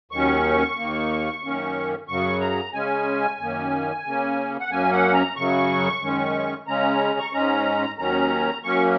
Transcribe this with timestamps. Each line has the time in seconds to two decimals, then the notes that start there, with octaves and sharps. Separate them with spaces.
0.12 D#2 D#3 F#3 C#4 C#6
0.78 D#2 D#3 A#3
1.42 F#2 D#3 A#3 C#4
2.08 F#2 C#3 F#3 C#6
2.41 A#5
2.73 C#3 G#3 C#4 G#5
3.39 F#2 D#3 A#3 C#4
4.05 C#3 A#3 C#4
4.60 F#5
4.70 F#2 F#3 A#3 C#4 G#5
4.92 F#5
5.14 A#5
5.36 F#2 C#3 F#3 C#6
6.02 F#2 D#3 G#3 C#4
6.67 C#3 G#3 C#4 A#5
7.20 C#6
7.33 G#2 G#3 C#4 A#5
7.98 D#2 D#3 F#3 C#4 A#5
8.63 F#2 F#3 A#3 C#4 C#6